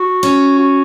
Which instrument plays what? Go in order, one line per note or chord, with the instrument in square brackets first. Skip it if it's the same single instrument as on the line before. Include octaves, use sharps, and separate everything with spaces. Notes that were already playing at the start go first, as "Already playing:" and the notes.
Already playing: [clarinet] F#4
[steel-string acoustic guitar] C#4
[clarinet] F#4